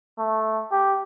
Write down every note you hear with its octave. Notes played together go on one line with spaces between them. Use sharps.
A3
G4